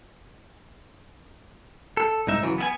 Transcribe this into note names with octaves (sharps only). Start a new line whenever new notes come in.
A4
C2 G#2 D#4 E5
C#3 E3 F#3
B3 E4 G#5